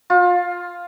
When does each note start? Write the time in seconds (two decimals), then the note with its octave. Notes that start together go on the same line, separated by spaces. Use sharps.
0.10 F4